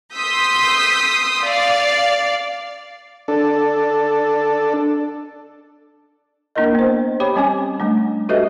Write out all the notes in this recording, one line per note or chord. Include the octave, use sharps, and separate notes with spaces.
C6 D#6 E6 G6 B6
D5 F5
D4 A4
A#3 D4 E4 A#4 D#5
B3 C5
G4 C#5 G5 B5 D6
G3 C4 C#4 C#5 G#5 D6
G3 A3 D4
F#4 G4 A4 B4 D#5 E5